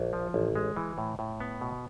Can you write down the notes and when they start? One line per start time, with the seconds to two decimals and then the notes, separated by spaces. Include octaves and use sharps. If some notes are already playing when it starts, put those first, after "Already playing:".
Already playing: A#1
0.13 F3
0.34 A1
0.56 G#3
0.76 E3
0.98 A2
1.19 A2
1.40 B3
1.61 B2